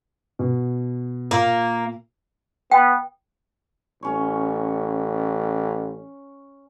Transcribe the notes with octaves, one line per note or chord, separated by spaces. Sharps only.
B2
A#2 A#3
B3 G5
A1 C#4 C#5